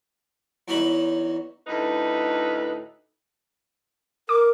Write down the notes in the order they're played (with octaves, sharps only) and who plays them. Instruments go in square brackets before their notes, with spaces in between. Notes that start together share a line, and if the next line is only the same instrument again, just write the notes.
[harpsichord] E2 F#3 C#4 D#4 F#4 B5
[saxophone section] D2 A2 D#4 B4
[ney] A#4 [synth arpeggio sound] D6